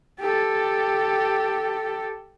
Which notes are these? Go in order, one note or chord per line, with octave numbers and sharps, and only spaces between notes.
G4 A4